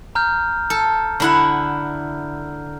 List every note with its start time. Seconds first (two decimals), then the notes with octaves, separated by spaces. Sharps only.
0.15 A#5 F6 G6
0.70 A4
1.20 D3 E4 F#5